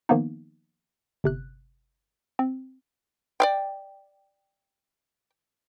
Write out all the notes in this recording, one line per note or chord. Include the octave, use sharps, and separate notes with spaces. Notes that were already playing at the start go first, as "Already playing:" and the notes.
D#3 F3 A#3 B3 D#4
G1 C3 F#6
C4
D5 F5 G5